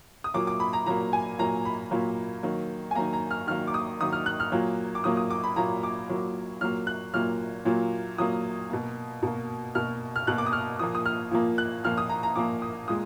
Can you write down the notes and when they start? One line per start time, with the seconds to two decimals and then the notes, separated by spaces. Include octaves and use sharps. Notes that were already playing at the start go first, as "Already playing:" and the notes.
0.24 D#6
0.34 A#2 F#3 A#3 D6
0.47 D6
0.60 B5
0.73 A#5
0.86 A#2 F#3 A#3 A#5
1.13 G#5
1.38 A#2 F#3 A#3 A#5
1.65 B5
1.91 A#2 F#3 A#3
2.43 D#3 F#3 A#3
2.91 G#5
2.95 D#3 F#3 A#3 A#5
3.13 A#5
3.31 F6
3.47 D#3 F#3 A#3 F6
3.67 D6
3.74 D#6
4.00 D#3 F#3 A#3 D#6
4.13 F6
4.26 F#6
4.40 F6
4.52 A#2 F#3 A#3
4.95 D6
5.04 A#2 F#3 A#3 D#6
5.17 D#6
5.30 D6
5.44 B5
5.56 A#2 F#3 A#3 A#5
5.83 D6
6.09 A#2 F#3 A#3
6.61 A#2 F#3 A#3 F6
6.87 F#6
7.14 A#2 F#3 A#3 F6
7.65 A#2 F#3 A#3
8.18 A#2 F#3 A#3 D#6
8.70 B2 A#3
9.23 B2 A#3
9.75 B2 A#3 F6
10.16 F6
10.27 B2 A#3 F#6
10.38 D6
10.46 D#6
10.53 F6
10.79 A#2 F3 A#3 D#6
10.95 D#6
11.06 F6
11.31 A#2 F3 A#3
11.58 F#6
11.85 A#2 F3 A#3 F6
11.98 D#6
12.09 A#5
12.23 A#5
12.36 A#2 F3 A#3 D6
12.62 D#6
12.88 A#2 G#3 D#6